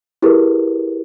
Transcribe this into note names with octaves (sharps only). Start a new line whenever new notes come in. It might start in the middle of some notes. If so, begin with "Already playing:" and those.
E4 G4 G#4 A#4 B4